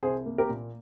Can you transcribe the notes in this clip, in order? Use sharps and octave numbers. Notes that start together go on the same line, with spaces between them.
C2 G#4 C5
A#3
G4 A#4
A#2